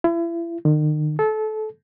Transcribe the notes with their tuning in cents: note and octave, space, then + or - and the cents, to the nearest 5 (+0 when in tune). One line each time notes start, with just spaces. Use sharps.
E4 +35
D#3 -40
A4 -25